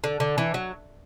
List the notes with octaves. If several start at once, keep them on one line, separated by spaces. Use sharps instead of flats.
D3
D3
E3
F#3